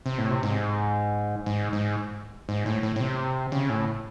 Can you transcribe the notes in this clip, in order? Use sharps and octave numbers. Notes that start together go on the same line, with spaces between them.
C3
A2
C3
G#2
G#2
G#2
G#2
A2
A2
A2
C3
C#3
A2